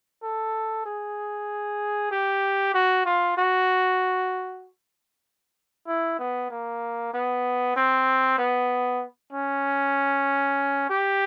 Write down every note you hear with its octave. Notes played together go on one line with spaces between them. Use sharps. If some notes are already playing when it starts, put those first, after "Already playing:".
A4
G#4
G4
F#4
F4
F#4
E4
B3
A#3
B3
C4
B3
C#4
G4